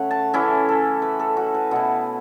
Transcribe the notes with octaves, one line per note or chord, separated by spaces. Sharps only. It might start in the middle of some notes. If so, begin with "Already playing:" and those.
Already playing: C#3 A3 B4 C#5 F#5
A5
E3 C#4 E4 A4
A4
B4
A4
F#4
B4
B2 B3 E4 F#5